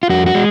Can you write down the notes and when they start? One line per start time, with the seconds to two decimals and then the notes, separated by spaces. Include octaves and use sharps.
0.03 F4
0.10 F2 F#4
0.26 F#4
0.35 G#3